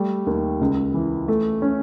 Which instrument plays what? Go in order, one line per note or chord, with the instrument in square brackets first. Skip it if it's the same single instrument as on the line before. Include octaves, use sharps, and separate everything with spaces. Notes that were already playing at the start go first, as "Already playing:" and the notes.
Already playing: [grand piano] G3 A3
D#2
C#2
E3
A3
C#4